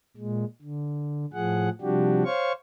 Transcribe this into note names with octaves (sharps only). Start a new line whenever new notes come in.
A#2 G#3
D3
A2 F3 G#4 F#5
C3 F3 G3 D4 F#4 G4
C5 C#5 F5 C#6